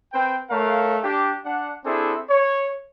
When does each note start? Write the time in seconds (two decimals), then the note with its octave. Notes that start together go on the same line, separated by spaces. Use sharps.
0.13 C4 B4 G5
0.50 A3 A#4 C#5 F5
1.02 D4 G4
1.44 D4 F#5
1.84 C4 D4 E4 G#4 A4
2.28 C#5